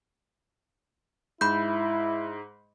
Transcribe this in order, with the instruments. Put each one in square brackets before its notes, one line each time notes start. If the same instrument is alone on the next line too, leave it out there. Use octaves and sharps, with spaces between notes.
[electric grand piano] G#2 [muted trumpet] E4 [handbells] B5 G6